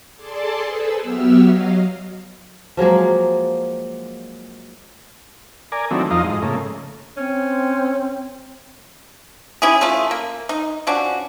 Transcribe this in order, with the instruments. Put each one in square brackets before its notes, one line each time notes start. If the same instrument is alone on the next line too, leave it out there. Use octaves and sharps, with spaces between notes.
[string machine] G#4 A4 D5 A5 C6 D6
G#4 A4 B4 C5 E6
F#3 B3 G4 E5 E6 F6
F#3 D#5 F5
[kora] F3 F#3 G#3 A#3
[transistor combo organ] A#4 D5 G#5
D#3 F#3 A3 C4 D4 E4
F2 F3 D#4 D#5 F5 A#5
G#2
C#3 A3 A#3
[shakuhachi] C4 [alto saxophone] C#4
[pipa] C#4 E4 G4 G#4
A3 C#4 F4
A#3
D#4
F3 C#4 D4 F#4